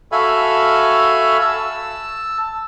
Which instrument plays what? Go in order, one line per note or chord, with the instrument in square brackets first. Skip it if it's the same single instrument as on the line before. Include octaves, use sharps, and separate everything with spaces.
[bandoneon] F#4 A4 E5 F5 G#5 B5
A5 E6